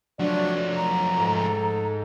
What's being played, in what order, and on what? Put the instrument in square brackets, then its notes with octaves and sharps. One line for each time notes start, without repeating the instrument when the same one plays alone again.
[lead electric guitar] F3 A3 [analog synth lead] F#3 [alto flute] D4 [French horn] D5
[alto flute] A#5
[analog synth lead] G#2 [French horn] A4